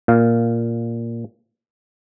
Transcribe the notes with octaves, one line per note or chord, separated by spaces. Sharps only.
A#2 F5